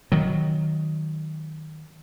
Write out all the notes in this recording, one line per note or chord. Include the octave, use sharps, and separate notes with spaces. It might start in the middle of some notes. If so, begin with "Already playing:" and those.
D#3 F#3